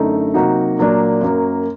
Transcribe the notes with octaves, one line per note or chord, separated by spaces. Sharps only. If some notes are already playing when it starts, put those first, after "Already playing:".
Already playing: F#2 D3 A3 D#4
C3 F#3 A#3 D#4 F#4
A#2 F#3 A#3 D4
F#2 F#3 A#3